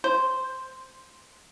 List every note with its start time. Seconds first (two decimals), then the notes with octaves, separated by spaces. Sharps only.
0.04 C5